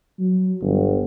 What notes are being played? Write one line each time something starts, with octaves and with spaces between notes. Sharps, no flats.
F#3
G1